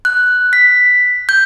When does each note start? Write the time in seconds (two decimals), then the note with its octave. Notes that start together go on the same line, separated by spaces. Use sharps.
0.05 F#6
0.53 B6
1.29 G6